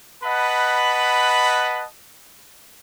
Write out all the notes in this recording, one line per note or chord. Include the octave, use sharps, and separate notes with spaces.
B4 D#5 F#5 A5 B5